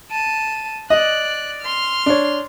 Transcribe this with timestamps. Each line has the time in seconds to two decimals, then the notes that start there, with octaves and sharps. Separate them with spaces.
0.11 A5 D#7
0.90 D5 D#5 F#6
1.62 C6 F6
2.06 D4 C#5